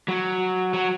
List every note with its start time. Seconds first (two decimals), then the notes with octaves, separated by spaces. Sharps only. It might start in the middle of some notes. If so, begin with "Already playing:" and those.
0.08 F#3
0.74 F#3